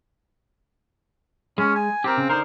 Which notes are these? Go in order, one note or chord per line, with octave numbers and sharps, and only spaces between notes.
G#3 C#4
G#5
C4 G4 A#4
C#3
D3 D#4 A#4 C5